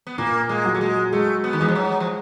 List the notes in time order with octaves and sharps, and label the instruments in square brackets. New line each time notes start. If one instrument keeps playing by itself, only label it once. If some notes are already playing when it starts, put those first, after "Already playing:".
[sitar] B3
[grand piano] A#2 [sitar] A#3
[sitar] G#3
[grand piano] F#3
[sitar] A3
G#3
[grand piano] G#3 [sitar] A3
[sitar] B3
D#3
[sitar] E3 [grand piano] G#3
[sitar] F3
F#3
F3